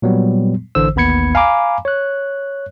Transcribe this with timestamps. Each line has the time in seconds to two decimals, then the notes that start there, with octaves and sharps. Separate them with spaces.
0.02 A#2 F#3 G3 B3
0.75 A1 D3 E3 C5 E6
0.95 A1 D#2 B3 B5 G#6 C#7
1.35 F5 G#5 A#5 B5 D6
1.85 C#5 F#6